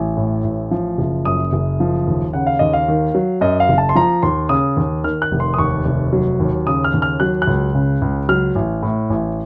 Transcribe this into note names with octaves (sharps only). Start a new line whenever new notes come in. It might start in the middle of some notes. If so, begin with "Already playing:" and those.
Already playing: A1
A2
A1
F3
F#1
F#2 D#6
F#1
F3
D#2
C#3 F#5
F5
D#2 D#5
F5
D#3
F#3
F#2 D#5
F5
F#1
A5
C6
F3 A#5
D#2 C6
C#3 D#6
D#2
D#3 F6
F#6
F1
C6
D#6
D#2 C#6
F1
F#3
D#2
C#3 D#6
F6
D#2
F6
F#3 F#6
F#6
C#2
C#3
C#2
F#3 F6
A1
A2
A1